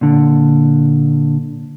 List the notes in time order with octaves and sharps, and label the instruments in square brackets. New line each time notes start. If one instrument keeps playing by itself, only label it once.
[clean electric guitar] A#2 D3